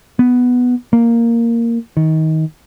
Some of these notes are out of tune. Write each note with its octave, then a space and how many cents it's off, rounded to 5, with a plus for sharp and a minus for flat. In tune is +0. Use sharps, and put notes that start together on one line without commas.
B3 +0
A#3 -5
D#3 +25